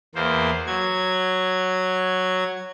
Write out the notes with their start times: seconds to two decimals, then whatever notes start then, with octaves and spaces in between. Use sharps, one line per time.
0.15 E2 A#3 C5
0.67 F#3 G#6